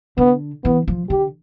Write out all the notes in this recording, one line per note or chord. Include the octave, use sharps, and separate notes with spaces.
D3 B3
E3 B3
F3
D3 G4